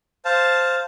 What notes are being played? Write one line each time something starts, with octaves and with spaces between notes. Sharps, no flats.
C5 F5 A5